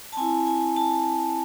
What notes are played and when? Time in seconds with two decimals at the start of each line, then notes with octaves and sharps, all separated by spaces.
0.12 A5
0.17 C4 E4 G#5
0.46 G#5
0.76 A5